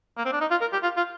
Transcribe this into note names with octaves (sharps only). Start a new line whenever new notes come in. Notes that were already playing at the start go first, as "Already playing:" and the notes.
A#3
C4
D4
D#4
F4
A#4
G4
F4
F4